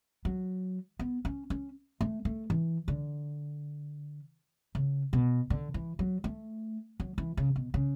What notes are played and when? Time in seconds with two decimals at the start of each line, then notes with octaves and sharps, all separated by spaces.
0.25 F#3
0.99 B3
1.25 C#4
1.50 C#4
2.01 A3
2.25 A3
2.50 E3
2.88 D3
4.75 C#3
5.13 B2
5.50 D3
5.74 E3
5.99 F#3
6.24 A3
7.00 F#3
7.18 E3
7.37 C#3
7.56 B2
7.74 C#3